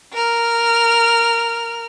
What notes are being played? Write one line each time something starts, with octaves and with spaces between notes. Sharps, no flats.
A#4 F6